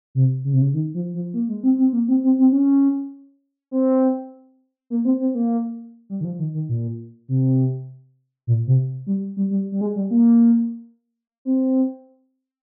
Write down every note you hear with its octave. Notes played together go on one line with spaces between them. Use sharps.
C3
C#3
C3
C#3
D#3
F3
F3
A#3
G#3
C4
C4
A#3
C4
C4
C4
C#4
C4
A#3
C4
C4
A#3
G3
D#3
F3
D#3
D#3
A#2
C3
A#2
C3
G3
G3
G3
G3
G#3
G3
A#3
C4